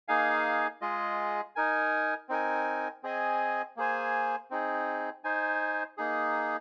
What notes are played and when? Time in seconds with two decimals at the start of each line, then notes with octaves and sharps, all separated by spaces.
0.08 A#3 D#4 G#4 F5 G#5
0.81 G#3 F4 G#4 D#5
1.56 D#4 A#4 G#5
2.29 C4 D#4 A#4 G#5
3.03 C4 G#4 D#5 G#5
3.77 A#3 G#4 C5 G#5
4.50 C4 D#4 G#4
5.24 D#4 C5 G#5
5.98 A#3 D#4 G#4